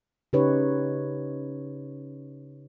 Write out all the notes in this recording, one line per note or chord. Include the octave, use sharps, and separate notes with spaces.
C#3 D#4 G4 B4 C#5